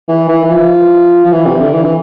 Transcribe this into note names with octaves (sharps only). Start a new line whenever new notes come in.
E3
E3
E3
F3
F3
E3
C3
D3
E3
E3